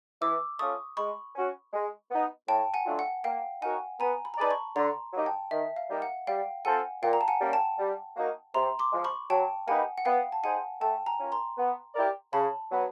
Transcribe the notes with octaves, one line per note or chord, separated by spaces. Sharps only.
E3 D6 E6
A3 C#4 F4 A4 C#6 D#6
G#3 B5 C#6
C#4 F#4
G#3
B3 D#4
A2 G5 A5
F#5 G#5
F#3 A3 D4 F4
F#5
A#3 F5 G5
D#4 F#4 A#4 C#5 F#5 G#5
B3 G#5 A#5
B5
A#5
D#4 G#4 B4 D5 A5 B5
B5 C#6
D3 A#5 C6
F#3 A#3 D#4 G4
G5 A5
D#3 E5
F5
G3 A#3 D#4 G4
F#5
G3 F5 G5
C4 F4 A4 F#5 G#5
A#2 F5 G5
A#5
A5
F#5 G#5
G3 A#3 C#4
G5 A5
G3
A#3 D#4 F#4 A#4
C3 A#5 C6
C6 D6
F3 G#3
B5 C#6
F#3 G5 A5
A#3 D#4 G4 B4 F#5 G#5
F#5
B3 F5 G5
A5
D#4 G#4 C5 F#5 G#5
A3 G5 A5
G#5 A#5
C#4 F4 A#4
A#5 C6
B3
E4 G4 A#4 D5
C#3 A5 B5
F#3 B3